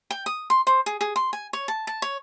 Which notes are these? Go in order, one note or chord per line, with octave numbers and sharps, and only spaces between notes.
G5
D#6
C6
C5
G#4
G#4
C6
G#5
C#5
A5
A5
C#5